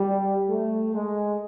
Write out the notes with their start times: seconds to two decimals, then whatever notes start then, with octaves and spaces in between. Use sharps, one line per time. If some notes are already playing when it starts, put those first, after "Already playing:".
Already playing: G3
0.48 A3
0.94 G#3